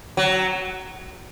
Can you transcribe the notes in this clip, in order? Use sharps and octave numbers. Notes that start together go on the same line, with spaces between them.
F#3